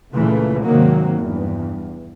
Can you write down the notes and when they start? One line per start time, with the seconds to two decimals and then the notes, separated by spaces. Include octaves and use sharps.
0.14 C#2 A#2 C#3 E3 A3
0.63 G#1 C3 D#3 F#3 A#3
1.18 E2 G2